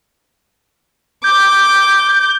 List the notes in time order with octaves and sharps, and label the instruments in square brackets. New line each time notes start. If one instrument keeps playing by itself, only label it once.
[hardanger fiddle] D6 [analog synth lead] G6